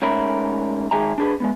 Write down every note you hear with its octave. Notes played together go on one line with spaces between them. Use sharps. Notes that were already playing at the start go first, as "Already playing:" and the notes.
G#2 A3 C#4 A#4 E5 B5
D#3 G#3 G#4 E5 G#5 A#5
D4 G#4 B4
G#3 A#3 B3